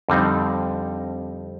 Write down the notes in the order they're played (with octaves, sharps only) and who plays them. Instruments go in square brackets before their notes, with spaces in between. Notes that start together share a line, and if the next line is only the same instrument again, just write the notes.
[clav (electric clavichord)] F2 D3 G3 C4 D#4